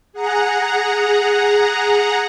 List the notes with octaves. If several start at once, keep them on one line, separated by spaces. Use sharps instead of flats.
G#4 F#5 A#5